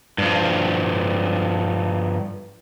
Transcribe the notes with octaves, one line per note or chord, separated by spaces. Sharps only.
G2 F3